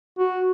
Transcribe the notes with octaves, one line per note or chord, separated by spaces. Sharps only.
F#4